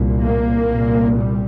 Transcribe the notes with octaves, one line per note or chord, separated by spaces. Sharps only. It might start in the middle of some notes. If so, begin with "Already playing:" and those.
Already playing: C2 A#2
A#3
C2 A#2
G3